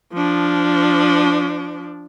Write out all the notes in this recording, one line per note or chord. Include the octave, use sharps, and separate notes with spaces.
F3 D4